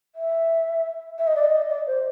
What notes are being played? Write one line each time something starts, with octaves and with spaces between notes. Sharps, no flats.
E5
E5
D#5
D5
D#5
D5
C5